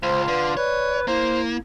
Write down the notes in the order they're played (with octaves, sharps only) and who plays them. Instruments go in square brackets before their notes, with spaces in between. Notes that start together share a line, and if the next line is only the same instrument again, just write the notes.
[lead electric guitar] C#2 [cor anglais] F4 [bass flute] C5
[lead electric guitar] D3 [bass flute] B4
[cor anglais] B4 [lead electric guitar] C#5 [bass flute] D5
[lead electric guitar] A#3 [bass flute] E4 [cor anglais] C5